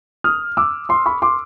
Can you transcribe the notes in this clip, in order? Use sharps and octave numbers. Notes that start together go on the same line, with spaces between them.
D#6 F6
D6 E6
C6 D6
B5 C#6
C6 D6